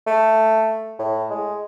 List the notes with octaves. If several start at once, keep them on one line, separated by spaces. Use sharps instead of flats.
A3
A2
G#3